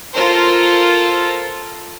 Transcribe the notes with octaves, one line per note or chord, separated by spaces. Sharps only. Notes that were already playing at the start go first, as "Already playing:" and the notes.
F4 A4 A#4 C5